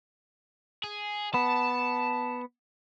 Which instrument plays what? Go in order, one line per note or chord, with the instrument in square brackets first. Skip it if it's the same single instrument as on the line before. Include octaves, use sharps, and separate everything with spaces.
[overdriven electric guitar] G#4
[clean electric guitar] B3 [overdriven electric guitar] A5